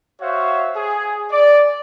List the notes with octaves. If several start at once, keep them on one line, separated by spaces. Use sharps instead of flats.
F#4 C5 C#5 E5 F5
G#4
D5